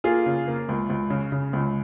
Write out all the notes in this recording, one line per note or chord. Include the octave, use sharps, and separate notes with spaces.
A#3 F4 G#4
C#3
A#3
C#2
C#2
C#3
C#3
C#2